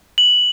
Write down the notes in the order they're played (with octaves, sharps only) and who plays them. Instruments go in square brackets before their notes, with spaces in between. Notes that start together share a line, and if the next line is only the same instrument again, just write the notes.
[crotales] F#7